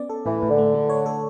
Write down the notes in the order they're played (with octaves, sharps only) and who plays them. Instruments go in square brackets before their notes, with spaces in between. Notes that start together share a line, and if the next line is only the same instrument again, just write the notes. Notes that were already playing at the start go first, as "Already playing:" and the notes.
Already playing: [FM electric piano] B3 C#4 D5
A4
[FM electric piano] A2 [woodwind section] E3
[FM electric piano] A2
[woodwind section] D3
[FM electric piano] A3
A3
C#5
A4